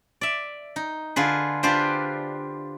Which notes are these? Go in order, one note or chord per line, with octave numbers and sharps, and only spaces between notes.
D5 E5
D#4
D3 F4 G#4 B4
D4 F4 G4 B4 C5